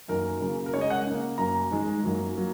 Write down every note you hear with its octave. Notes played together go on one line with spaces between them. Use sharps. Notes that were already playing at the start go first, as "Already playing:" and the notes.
F#2 D#3 F#3 A#3 A#4
C#3 F#3 A#3
A#4
C#3 G#3 C#5
D#5
F#5
C#3 A#3
F#2 F#3 A#3 A#5
G#2 D#3 G#3
F#2 D#3 F#3 A#3
F#3 A#3